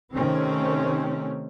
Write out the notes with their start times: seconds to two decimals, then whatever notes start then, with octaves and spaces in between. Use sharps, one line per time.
0.14 C3 D#3 A3 C4 C#4